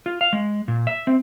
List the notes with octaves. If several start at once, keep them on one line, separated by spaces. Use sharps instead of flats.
F4
F5
G#3
A#2
E5
C4